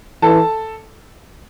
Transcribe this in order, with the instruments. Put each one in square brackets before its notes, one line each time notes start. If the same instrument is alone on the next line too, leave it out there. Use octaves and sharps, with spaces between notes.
[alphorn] E3 [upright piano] A4 A5